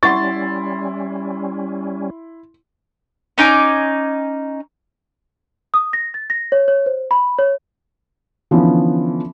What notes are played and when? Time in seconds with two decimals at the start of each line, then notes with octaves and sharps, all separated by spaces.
0.03 G3 C#4 E4 F#5 C6 C#6 A6
3.38 C#4 D#4 G#5 D6
5.74 D#6
5.93 A#6
6.14 A6
6.30 A#6
6.52 C#5
6.68 C#5
6.86 C5
7.11 B5
7.39 C#5
8.51 D3 E3 F3 B3 C#4